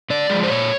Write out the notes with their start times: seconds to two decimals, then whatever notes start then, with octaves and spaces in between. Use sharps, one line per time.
0.10 D3 D5
0.30 F3 G#3
0.44 C5
0.50 A#2 C#5